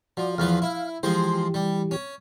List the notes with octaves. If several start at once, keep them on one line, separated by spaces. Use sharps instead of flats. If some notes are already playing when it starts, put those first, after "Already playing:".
F3 F#4 D5
E2 F3 B4 F5
E4
E3 F3 G#3 G4 C5
G3
C#4